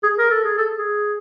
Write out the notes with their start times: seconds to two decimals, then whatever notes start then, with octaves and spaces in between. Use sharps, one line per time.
0.03 G#4
0.19 A#4
0.31 A4
0.44 G#4
0.58 A4
0.78 G#4